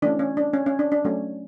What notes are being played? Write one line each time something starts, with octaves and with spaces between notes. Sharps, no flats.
E3 A3 C#4 D4
C#4
D4
C#4
C#4
D4
D4
F#3 A3 C#4